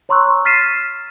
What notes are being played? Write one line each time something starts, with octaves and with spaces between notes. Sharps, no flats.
C#5 A#5 C6 C#6 E6 F#6
F6 A6 B6 C7 D#7 E7